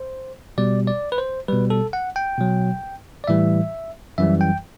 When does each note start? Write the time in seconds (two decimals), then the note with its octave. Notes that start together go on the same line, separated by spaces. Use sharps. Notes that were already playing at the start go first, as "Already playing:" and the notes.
Already playing: C5
0.58 B2 G3 D5
0.87 D5
1.12 B4
1.18 C5
1.48 B2 G3 B4
1.70 A4
1.93 F#5
2.16 G5
2.38 B2 F#3
3.24 D5
3.27 A2 E3 G3 E5
4.18 F#2 E3 G3 E5
4.41 G5